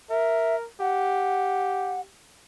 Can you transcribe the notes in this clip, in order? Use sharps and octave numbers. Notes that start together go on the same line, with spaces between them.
A#4 E5
G4 F#5